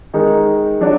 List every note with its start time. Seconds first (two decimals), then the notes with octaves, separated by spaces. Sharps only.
0.14 D#3 G#3 D#4 A#4
0.81 F#3 D4 F#4